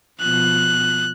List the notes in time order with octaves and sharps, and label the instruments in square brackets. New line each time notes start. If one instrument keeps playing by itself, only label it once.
[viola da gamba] B2 F3 [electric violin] F#6